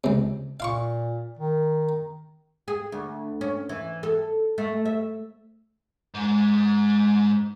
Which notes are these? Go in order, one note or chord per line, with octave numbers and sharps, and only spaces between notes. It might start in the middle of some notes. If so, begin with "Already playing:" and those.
C#2 C3
A#2 F5 C6 C#6
D#3
G#4
D2
C#4
E3
A4
A3
E5
G#2 G#3